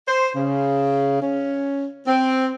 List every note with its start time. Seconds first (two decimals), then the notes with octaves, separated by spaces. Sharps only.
0.08 C5
0.35 C#3
1.21 C#4
2.07 C4